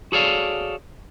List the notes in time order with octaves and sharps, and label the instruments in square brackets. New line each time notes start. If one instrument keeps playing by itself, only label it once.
[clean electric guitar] F#4 G#4 A4 C#5 D5 F5